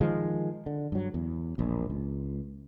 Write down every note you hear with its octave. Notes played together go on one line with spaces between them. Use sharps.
D#3 F3 G#3
D3
G2 F#3
E2
E1 A#1
C#2